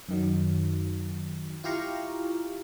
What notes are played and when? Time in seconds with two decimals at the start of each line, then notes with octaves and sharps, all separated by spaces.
0.09 F#2 D#3 F#3
1.64 E4 F4 G4 F5 A#5 C#6